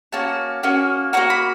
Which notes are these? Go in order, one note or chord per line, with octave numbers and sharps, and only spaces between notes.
A#3 C#4 F#4 A5
A#3 C#4 F#4
A#3 C#4 F#4 A#5
B5